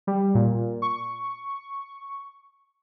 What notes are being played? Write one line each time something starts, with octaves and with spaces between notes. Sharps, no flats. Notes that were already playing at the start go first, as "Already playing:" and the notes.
G3
A#2
C#6